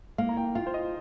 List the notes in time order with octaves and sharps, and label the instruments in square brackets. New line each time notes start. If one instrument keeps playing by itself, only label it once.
[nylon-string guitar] A#3 [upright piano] F5
[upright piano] A#5
G5
[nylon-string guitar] F4 [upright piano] F5
[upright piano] C5
D#5